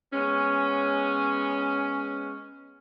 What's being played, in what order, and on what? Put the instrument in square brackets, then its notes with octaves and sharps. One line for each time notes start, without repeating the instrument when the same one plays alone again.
[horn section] G#3 B3 C#4